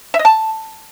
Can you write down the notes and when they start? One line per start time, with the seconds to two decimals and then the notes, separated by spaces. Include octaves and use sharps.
0.14 E5
0.19 D#5
0.25 A5